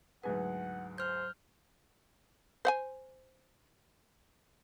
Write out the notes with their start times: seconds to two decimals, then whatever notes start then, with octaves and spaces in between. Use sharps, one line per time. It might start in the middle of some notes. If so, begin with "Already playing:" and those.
0.23 D2 G#2 F#3 G#4 B4 F#5
0.98 C5 F6 G6
2.65 C5 F#5 G#5